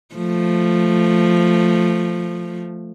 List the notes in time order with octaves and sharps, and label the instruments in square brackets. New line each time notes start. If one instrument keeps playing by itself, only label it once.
[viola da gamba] F3 A3